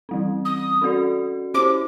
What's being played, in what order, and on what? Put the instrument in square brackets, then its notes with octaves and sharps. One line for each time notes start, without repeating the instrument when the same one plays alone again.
[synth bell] E3 G3 C4
[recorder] D#6
[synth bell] C#4 F#4 A4 D5
[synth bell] C#4 E4 G4 C5 [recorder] D6